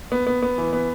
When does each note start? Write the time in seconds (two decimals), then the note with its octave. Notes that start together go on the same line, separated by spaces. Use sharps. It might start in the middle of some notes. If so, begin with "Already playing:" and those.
0.12 B3
0.27 B3
0.42 B3
0.58 E3
0.73 B3